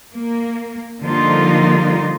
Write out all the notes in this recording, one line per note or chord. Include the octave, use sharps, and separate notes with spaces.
A#3
D3 F3 G3 A#3 D#4 F4